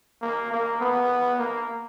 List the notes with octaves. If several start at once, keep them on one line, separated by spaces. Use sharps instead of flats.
A#3
A#3
B3
A#3